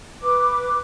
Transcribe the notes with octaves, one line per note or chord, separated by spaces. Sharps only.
B4 D6